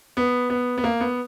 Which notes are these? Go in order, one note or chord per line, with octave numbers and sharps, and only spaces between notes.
B3
B3
B3
A#3
B3